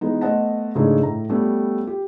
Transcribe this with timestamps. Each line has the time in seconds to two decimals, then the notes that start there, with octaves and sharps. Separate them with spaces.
0.01 E3 G#3 B3 D#4
0.21 A3 B3 C5 D#5 F#5 A5
0.75 G#2 C#3 E3 A3 D4 G#4
1.03 A2 A#5
1.29 G3 A3 B3 C#4 G4 A4
1.87 G4